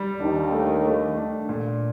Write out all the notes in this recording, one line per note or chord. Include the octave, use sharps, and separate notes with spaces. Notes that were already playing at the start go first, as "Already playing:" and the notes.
Already playing: G3
D#2 D#3 D4
A3
A3
D4
A#2